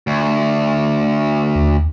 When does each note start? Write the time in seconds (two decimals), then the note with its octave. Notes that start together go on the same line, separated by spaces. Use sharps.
0.07 D2
1.55 D#2